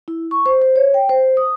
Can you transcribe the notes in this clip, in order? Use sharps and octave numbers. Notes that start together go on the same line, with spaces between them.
E4
C#6
C5
C5
C#5
G5
C5
D#6